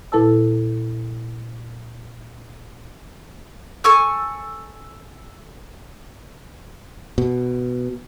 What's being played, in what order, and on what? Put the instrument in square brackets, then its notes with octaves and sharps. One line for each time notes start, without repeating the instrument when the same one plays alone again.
[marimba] A#2 E4 A4 B4 A5 E6
[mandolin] A4 G#5 C#6 E6
[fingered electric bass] B2